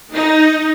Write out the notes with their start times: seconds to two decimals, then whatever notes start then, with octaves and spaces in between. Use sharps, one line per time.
0.12 D#4